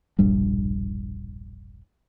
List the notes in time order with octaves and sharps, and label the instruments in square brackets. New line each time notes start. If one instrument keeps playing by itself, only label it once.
[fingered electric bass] E1 A#1 G2 G3